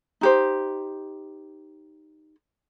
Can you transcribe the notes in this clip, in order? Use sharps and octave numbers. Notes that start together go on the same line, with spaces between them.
D#4 G4 C5